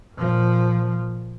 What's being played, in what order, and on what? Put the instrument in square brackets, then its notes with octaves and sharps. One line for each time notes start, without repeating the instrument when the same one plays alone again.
[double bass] A#2 F3